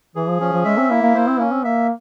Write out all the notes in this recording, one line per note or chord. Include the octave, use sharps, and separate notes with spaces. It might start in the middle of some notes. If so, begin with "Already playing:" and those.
E3 G#4
F3
F3 C#4
F3
G#3 E5
C4
A#3 E4
A#3
A#3 C5
C4
A#3 C#4
C4
A#3 E5